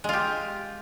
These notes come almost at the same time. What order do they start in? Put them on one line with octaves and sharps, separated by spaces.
G#3 F4 G4